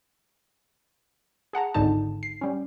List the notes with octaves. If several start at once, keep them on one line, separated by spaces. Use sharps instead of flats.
G#4 F#5 A5 A#5
G#1 C#2 G#2 D3 D#4 A5
C7
G3 C#4